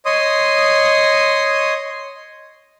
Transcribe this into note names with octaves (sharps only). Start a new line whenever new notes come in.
C#5 D#5 C6 D#6